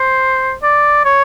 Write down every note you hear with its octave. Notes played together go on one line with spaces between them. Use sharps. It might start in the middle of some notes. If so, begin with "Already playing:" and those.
Already playing: C5
D5
C#5